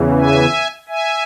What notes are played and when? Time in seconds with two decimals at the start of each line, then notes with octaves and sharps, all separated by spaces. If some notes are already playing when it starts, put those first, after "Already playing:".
Already playing: E2 C#3 E3
0.18 E5 G#5
0.88 E5 G#5